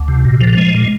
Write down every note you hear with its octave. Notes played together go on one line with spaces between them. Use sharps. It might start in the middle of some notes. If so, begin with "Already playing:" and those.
Already playing: D2
C3
A#2
F3
G#3
A#2